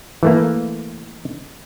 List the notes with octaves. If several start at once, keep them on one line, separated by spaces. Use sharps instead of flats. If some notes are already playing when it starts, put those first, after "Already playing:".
E3 A3 A#3